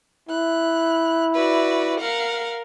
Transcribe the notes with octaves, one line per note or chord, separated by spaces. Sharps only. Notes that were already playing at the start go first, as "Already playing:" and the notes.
E4 F#6
F#4 B4 D5
A#4 F5 F#5